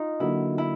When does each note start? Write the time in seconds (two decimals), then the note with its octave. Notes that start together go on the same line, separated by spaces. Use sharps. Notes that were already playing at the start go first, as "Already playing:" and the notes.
Already playing: D#4 F4
0.20 D3 F#3 A#3 E4
0.58 E4